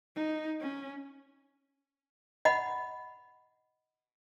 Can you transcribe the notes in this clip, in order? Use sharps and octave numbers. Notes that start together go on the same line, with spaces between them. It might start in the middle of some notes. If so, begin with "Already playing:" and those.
D#4
C#4
D#5 F#5 B5